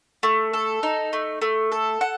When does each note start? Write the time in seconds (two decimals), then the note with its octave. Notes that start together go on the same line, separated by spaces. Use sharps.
0.23 A3
0.53 A4
0.83 D#4
1.13 A3
1.42 A3
1.72 A4
2.01 F#5